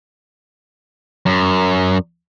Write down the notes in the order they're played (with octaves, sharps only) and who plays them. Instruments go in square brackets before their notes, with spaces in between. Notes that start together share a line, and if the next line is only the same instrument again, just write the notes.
[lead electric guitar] F#2